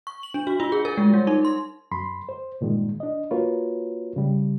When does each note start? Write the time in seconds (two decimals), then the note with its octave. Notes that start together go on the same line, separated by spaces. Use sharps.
0.07 C#6
0.23 F#7
0.34 D4
0.47 F#4
0.60 F4
0.72 G#4
0.85 A#4
0.98 G#3
1.14 G3
1.27 D#4
1.45 C6
1.91 F#2 B5 C6
2.29 C5
2.61 G2 A#2 D#3 G#3
3.00 D4 D#5
3.31 A#3 F4 F#4 A#4 B4 C#5
4.16 C#3 G3